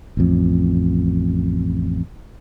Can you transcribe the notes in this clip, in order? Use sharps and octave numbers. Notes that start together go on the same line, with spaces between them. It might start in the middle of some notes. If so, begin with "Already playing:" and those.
A1 F2